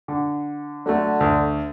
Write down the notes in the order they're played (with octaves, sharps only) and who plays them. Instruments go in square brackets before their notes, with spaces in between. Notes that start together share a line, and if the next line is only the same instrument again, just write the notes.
[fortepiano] D3
[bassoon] D3 [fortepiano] F#3 A3
[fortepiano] D2